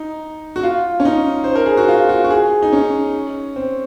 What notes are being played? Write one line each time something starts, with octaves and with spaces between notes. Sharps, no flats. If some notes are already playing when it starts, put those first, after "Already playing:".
Already playing: D#4
F#4
F4
C#4
D#4
C5
A#4
G#4
F#4
F4
F#4
F#4
G#4
D#4
C#4
C4